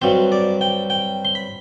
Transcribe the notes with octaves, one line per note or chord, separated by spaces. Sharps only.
G2 F#3 C4 C5
D5
G5
G5
C6
B5